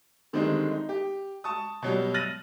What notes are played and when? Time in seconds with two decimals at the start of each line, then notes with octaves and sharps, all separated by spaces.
0.33 D3 D#3 G3 G#3 C4 D#4
0.71 D#4
0.89 G4
1.44 A5 C#6 D#6
1.82 B2 F#3 G3
2.14 F6 A6 A#6 D#7 F#7